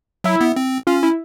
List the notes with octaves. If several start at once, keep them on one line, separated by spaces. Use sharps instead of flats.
F#3 E4
B3
C4
C#4 F4
E4